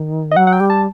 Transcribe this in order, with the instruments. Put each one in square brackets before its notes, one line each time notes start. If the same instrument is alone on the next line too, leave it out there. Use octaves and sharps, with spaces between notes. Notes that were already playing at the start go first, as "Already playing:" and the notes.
Already playing: [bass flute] D#3
[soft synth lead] D#5
[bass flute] F#3 [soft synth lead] F#5
[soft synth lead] F#5
G5
[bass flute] G3
[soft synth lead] A5